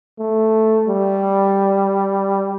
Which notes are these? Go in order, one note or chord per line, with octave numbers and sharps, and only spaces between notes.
A3
G3